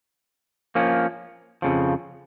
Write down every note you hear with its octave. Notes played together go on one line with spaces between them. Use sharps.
F3 A#3 C#4
F2 C#3 F3